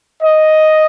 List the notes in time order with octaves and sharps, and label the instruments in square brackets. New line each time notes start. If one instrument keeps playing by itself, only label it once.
[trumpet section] D#5